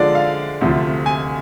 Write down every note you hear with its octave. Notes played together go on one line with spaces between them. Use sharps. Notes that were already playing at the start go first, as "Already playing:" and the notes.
Already playing: D3 F3 G#3 D4 F4 D5
F5
D2 C3 F3
G#5